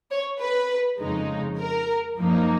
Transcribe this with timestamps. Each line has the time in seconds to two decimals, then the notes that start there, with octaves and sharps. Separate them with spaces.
0.11 C#5
0.40 B4
1.00 F2 C#3 G#3 D#4
1.59 A#4
2.17 F#2 F3 A#3 D#4